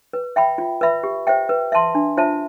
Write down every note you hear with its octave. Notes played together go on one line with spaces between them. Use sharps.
B4
E5 G5 B5
F4
B4 E5 B5
G4
C5 E5 G5
B4
E5 A5 C6
D4
F4 C5 E5 A5